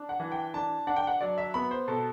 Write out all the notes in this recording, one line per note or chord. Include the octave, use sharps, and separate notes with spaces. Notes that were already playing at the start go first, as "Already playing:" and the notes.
Already playing: D4
F#5
E3
G5
D4 A5
D4 F#5
G5
F#5
F#3 D5
E5
B3 B5
C5
B2 A4